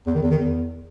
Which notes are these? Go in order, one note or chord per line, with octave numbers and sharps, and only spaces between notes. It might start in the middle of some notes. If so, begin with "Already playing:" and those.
E2
D#3
E2
D#3
E2